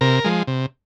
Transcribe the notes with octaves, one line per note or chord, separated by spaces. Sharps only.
C3 A#4
F3 G#3
C3